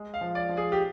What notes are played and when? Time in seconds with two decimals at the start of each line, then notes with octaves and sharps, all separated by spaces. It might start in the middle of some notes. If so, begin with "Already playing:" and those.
Already playing: G#3
0.14 F5
0.21 F3
0.35 D5
0.49 F3
0.57 G#4
0.72 G4